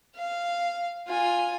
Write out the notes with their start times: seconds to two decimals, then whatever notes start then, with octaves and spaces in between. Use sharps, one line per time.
0.16 F5
1.08 F4 G#5